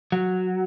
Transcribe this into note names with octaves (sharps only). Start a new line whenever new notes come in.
F#3